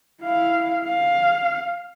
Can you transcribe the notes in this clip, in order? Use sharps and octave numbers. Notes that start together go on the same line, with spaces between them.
E4 F5
F5